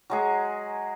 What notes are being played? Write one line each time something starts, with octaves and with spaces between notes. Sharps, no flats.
F#3 G#3 G#4